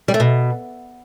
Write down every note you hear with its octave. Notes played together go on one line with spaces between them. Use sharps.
G3
A3
B2